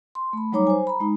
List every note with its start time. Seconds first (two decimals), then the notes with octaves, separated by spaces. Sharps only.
0.15 C6
0.33 A3 B5
0.52 F#3 G3 D#4 C#5 A#5 D6
0.67 C5 G#5
0.87 A#5 B5
1.00 G#3 D#4